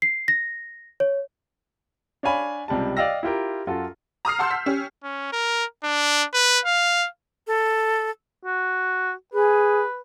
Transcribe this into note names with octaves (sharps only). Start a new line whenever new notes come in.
C7
A#6
C#5
D4 C#5 F5 G#5 B5
C#2 C3 G3 G4 A5
D5 D#5 F5 G5 E6 A#6
E4 F4 G4 A#4
F#2 F4 F#4 A4
A#5 D#6 F6 C7
F#5 A5 C6 E6 G6
B6
C#4 G4
C#4
A#4
D4
B4
F5
A4
F#4
G#4 B4